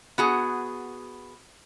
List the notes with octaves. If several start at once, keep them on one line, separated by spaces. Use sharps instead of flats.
B3 F#4 G#4